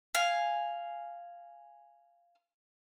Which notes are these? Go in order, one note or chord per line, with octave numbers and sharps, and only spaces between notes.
F5 G#5